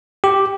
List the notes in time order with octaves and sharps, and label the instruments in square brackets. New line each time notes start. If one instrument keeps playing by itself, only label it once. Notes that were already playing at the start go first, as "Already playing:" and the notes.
[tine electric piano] G4